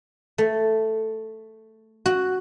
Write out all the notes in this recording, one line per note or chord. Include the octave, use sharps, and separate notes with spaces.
A3
F#4